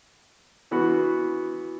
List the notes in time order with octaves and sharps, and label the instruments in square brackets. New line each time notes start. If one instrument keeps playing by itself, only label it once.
[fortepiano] E3 B3 F#4